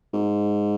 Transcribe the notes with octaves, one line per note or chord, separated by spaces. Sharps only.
G#2